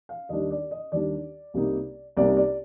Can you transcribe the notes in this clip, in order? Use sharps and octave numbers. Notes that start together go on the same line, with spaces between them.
F5
D#2 D#3 G3 D4 D#5
D5
D#5
D#2 D#3 G3 D4 D5
C2 C3 G3 A#3 D#4
C2 C3 G3 A#3 D#4 D5
D5